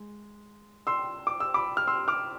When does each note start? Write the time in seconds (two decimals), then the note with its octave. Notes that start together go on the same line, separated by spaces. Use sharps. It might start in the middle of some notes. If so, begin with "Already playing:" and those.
Already playing: G#3
0.87 C6 E6
1.27 D6
1.40 E6
1.54 B5 D6
1.77 F6
1.87 C6 E6
2.08 D6 F6